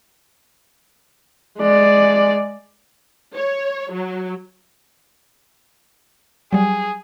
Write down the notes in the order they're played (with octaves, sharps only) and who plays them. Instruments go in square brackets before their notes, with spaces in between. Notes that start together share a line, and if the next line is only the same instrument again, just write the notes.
[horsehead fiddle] G#3 D5
[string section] C#5
F#3
[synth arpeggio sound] F#3 G3 [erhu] G#4